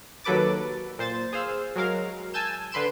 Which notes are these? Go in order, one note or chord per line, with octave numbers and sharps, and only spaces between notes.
D#2 F#3 A4 B4 D6 A6
A#2 C5 A6
G#4 C5 F5 E6
F#3 G#3 A#4 F5
G#5 A5 E6 G6 E7
D3 B4 C6 D7 E7